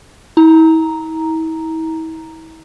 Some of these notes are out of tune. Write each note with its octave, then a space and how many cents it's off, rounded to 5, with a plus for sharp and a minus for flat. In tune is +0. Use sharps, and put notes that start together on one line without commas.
E4 -40 A#5 +0